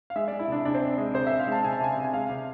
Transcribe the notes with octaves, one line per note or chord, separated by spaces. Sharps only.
F5
G#3 E5
G#3 D5
E4
C3 D4
C3 D4
C4
C3 D4
G#3
C3 C5
C3 E5
F5
G#3 A5
C3 G#5
A5
C3 G#5
C3
G#5
G#3 F5
C3